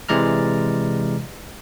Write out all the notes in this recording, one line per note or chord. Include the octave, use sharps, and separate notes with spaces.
C3 E3 G#3 D5 A#5 F6